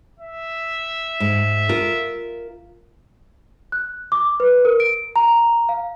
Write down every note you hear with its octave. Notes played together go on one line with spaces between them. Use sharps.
E5
G#2
F4 A#4
F#6
D6
B4
A#4
D7
A#5
F5